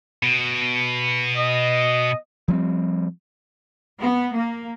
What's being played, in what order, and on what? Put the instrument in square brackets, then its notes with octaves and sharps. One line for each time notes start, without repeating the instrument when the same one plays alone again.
[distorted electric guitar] B2
[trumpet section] D#5
[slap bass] F3 G3 A3 C4
[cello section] B3
A#3